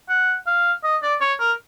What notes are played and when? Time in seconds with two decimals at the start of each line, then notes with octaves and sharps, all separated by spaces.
0.09 F#5
0.46 F5
0.84 D#5
1.02 D5
1.21 C#5
1.39 A#4